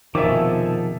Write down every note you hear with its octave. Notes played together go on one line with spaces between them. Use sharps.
F1 B2 D#3 F3 G#4 A4 E5 D6